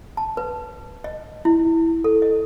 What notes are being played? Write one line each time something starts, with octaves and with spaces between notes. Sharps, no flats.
A5
B4
D#5
E4
A4
D#5